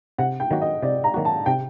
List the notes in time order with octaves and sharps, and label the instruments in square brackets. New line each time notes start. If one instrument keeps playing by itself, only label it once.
[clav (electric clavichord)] C3 [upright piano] F#5
[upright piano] G5
[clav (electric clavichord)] D#3 F#3 A#3 F#4
[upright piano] D#5
[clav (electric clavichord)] C3 [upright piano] D5
[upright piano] A#5
[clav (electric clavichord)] D#3 F#3 A#3 F#4
[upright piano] A5
[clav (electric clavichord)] C3 [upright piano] G5